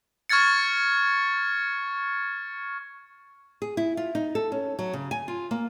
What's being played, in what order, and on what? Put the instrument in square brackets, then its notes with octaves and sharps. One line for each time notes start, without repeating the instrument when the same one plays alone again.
[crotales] C#6 F6 G#6 A6 C#7
[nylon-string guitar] G#4
E4
F4
D#4
A4
C#4
F#3
C#3
G#5
F4
A#3